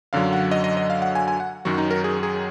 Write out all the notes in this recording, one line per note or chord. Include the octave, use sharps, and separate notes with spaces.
F#2 D3 F#3 F5
F#5
D#5
D#5
D#5
F5
F#5
G#5
G#5
F#5
F#2 D#3 F#3 F#4
D#4
A#4
G#4
G#4